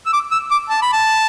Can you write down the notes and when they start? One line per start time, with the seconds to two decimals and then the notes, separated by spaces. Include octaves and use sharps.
0.06 E6
0.13 D6
0.32 E6
0.51 D6
0.70 A5
0.82 B5
0.93 A5